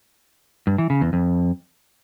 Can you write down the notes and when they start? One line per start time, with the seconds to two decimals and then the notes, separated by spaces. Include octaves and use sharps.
0.67 G2
0.78 E3
0.90 C#3
1.01 E2
1.13 F2